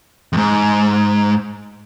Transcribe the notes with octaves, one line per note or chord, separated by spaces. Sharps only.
F2 G#2